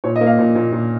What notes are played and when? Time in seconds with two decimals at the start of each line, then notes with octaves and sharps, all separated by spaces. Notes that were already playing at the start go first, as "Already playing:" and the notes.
0.04 A#2 C#5
0.16 D#5
0.21 A#3
0.27 F5
0.39 A#2
0.55 A#2
0.72 A#2